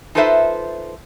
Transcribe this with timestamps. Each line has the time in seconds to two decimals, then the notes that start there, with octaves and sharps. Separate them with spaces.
0.15 D#4 F4 A4 B4 C5 E5